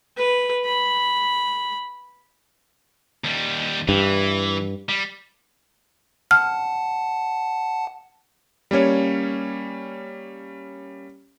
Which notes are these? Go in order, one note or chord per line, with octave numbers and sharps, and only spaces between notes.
B4
B5
D#2 G3
G2 E3
G3
F#5 A5 F6
G3 A#3 C#4 C#5